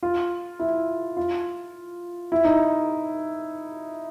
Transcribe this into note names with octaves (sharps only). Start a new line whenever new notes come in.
F4
E4
F4
E4
D#4